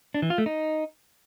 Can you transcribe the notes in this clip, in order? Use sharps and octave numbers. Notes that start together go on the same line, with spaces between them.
D4
E3
F4
A3
D#4